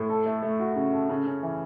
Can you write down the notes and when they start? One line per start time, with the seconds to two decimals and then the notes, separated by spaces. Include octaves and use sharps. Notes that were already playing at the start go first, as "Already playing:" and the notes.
Already playing: A2
0.10 A4
0.26 A3
0.42 A3
0.60 F#4
0.76 C#3
0.93 A4
1.09 C#3
1.26 C#4
1.43 E3